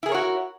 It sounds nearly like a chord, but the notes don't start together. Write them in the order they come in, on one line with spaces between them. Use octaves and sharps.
E4 G#4 A#4 C#5 F#4